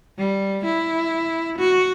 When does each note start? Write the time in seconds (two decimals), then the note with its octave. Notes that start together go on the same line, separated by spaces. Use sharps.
0.18 G3
0.65 E4
1.58 F#4